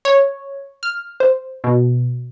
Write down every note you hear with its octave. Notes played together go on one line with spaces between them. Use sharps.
C#5
F6
C5
B2